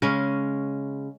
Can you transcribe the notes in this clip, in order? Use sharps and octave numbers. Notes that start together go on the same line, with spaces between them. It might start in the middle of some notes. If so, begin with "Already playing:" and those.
C#3 G#3 C#4